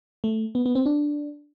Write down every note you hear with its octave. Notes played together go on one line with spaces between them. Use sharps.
A3
B3
B3
C4
D4